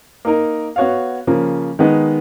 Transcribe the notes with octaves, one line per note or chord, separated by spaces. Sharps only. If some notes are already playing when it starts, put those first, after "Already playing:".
A#3 D#4 A#4
B3 F#4 C#5 F5
C#3 F3 A#3
D#3 G#3 B3 D#4